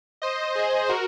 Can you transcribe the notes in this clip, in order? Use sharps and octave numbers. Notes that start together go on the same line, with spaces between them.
C5 D#5
G#4 C5
F#4 A#4